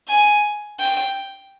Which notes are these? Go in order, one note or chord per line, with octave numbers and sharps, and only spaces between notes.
G#5
G5